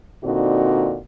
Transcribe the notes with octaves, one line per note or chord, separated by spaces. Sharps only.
A#2 D3 C4 D#4 F#4